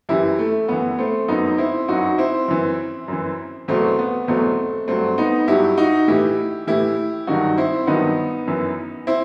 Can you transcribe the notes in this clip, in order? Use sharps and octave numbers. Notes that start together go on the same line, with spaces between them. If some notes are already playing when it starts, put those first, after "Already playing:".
F#2 E3 E4 G4
A3
F#2 E3 B3
A3 C4
F#2 F#3 B3 D#4
C4 E4
F#2 F#3 D#4 F#4
C4 E4
F#2 E3
F#2 E3
E2 B2 F#3 A3 C4
B3
E2 B2 F#3 A3 C4
G2 F#3 A3 C4
B3 D#4
G2 F#3 E4 G4
D#4 F#4
A2 E3 E4 G4
A2 E3 E4 G4
G2 D#3 F#3 D#4 F#4
C4 E4
G2 D#3 F#3 B3 D#4
F#2 E3
C4 E4